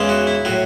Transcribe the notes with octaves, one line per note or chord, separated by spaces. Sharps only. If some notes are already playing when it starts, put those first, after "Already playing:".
Already playing: E2 C#3 E3 G#3
F#4
E4
A2 F#3 F#4